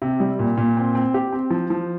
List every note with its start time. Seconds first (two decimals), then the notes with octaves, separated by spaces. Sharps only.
0.02 C3
0.20 G3
0.39 A#2
0.57 A#2
0.77 C4
0.95 C4
1.14 G4
1.33 C4
1.50 F3
1.70 F3